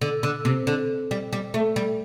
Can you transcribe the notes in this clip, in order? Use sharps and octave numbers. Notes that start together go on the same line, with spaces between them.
D3
D3
C3
D3
G3
G3
A3
G3